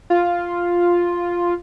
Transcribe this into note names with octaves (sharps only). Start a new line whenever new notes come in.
F4